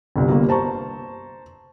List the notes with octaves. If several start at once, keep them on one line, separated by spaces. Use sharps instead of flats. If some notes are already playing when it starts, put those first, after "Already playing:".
G1 C2
G1 G3 A#3
C5 A5 A#5 C#6